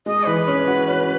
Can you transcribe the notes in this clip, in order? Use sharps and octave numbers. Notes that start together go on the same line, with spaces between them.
G#3 D#5
E3 B4
C#4
F#4
C#4